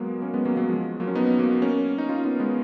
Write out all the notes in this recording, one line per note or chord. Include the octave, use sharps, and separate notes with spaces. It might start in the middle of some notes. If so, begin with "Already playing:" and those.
Already playing: F#3 G#3 A#3 B3
A#3 C#4
G#3 B3
F#3 A#3
F#3 A#3
F3 G#3
F#3 A#3
C#4
B3 D#4
F#3 A#3
A#3 C#4
D#4
C#4 F4
B3 D#4
G#3 B3